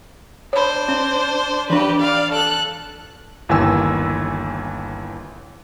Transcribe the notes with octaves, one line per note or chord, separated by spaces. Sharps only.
D4 C5 C#5 B5
C#4
E3 D4 G4 B4
D5 F5
A4 F#6
G1 D#2 E3 G#5 E6